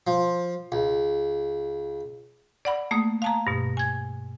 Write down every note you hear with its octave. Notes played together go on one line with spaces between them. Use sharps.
F3
C#2
D5 F#5 B5
A3 A#3 D#6
F5 A5 A#5
G2 B2
G#5 G#6